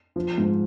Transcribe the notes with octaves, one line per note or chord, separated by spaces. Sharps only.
F3
G#2